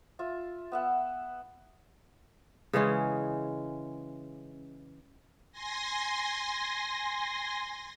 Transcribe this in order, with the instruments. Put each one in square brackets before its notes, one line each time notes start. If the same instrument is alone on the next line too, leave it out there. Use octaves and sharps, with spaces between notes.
[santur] F4 E5
B3 E5 F#5
[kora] C#3 E3 G#3 C#4
[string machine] G#5 C6 A#6